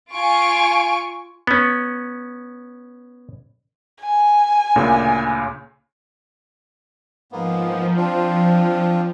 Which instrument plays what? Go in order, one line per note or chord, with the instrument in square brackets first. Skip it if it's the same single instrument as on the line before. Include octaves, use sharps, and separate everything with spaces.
[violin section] F4 G#5 C#6 D7
[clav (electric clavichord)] B3 C#4
[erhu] G#5
[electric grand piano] D2 A#2 C#3
[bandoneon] G#2 A#3 B3 [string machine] F3
[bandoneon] C4 D4 F4